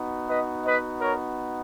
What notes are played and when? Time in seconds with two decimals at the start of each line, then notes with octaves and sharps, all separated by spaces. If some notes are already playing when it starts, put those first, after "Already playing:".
Already playing: B3 D#4 F#4
0.29 B4 D#5
0.65 B4 D#5
1.02 A#4 C#5